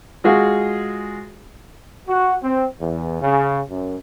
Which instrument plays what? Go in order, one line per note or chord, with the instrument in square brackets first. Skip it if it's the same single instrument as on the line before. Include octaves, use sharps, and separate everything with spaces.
[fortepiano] G#3 F4 F#4 G#4
[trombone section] F#4
C4
E2
C#3
F#2